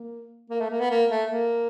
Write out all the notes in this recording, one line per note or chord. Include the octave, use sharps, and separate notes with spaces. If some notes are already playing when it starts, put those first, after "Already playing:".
Already playing: A#3
A#3
A3
A#3
B3
A#3
A3
A#3